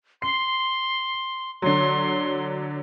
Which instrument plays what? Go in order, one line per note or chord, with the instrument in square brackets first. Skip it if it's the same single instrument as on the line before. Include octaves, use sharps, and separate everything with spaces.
[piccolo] C6 [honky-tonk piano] C7
[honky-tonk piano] D3 F#3 [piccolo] C6